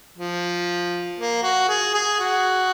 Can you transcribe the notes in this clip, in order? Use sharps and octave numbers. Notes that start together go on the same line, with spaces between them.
F3
A#3
F#4
G#4
G#4
F#4